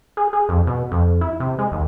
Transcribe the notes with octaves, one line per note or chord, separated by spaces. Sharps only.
G#4
G#4
F2
B2
F2
E4
C3
G#3
D#2